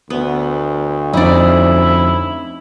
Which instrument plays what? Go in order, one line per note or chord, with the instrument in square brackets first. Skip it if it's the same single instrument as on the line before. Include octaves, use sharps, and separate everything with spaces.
[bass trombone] D2 [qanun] B3
[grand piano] F2 C#4 C5 [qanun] D#4 D5 [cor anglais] E4